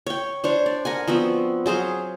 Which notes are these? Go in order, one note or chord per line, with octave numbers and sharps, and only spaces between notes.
C#5 G5
D4 C5 C#5
D5
A#4 F#5 G#5
F3 B3 C4 F#4
F#3 G#4 C5 F5